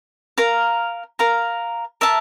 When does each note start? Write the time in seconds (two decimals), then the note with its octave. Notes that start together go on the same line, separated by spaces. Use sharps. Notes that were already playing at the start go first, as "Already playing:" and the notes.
0.38 A#4 F5 A#5
1.19 A#4 F5 A#5
2.01 A#4 E5 A5